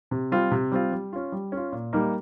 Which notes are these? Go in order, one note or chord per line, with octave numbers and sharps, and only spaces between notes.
C3
G3 C4 F4
C3
G3 C4 F4
G3
C#4 F4
G3
C#4 F4
A#2
G3 A#3 D#4